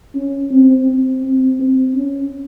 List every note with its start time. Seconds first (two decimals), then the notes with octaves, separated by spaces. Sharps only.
0.15 C#4
0.51 C4
0.88 C4
1.24 C4
1.60 C4
1.95 C#4